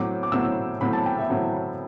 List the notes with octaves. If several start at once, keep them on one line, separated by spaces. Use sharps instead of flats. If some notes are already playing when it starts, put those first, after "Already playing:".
Already playing: A2 F#3 C4 D6
D6
A2 F#3 C4 E6
A2 F#3 C4 B5
A5
G5
E5
A2 F#3 C4